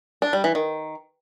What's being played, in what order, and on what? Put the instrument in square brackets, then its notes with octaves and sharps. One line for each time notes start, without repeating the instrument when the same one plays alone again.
[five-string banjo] D4
G3
E3
D#3